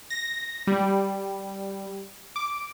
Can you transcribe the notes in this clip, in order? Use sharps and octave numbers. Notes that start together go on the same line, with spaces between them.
A#6
G3
D6